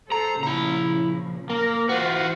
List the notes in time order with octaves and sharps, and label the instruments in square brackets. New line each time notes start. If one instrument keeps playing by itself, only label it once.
[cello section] A4 C5 [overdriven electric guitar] A#5
[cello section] A#2 C#3 F3 [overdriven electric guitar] E4 A#5
[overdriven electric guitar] A#3 [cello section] A#4
[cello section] E3 C5 E5 [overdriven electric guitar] F4 F#4